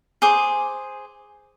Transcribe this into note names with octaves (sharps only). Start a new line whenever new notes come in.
G#4 C5 D6